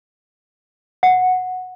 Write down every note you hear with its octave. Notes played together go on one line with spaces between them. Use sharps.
F#5